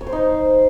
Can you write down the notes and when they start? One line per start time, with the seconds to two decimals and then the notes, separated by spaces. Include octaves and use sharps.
0.01 C#5
0.07 C5
0.12 D#4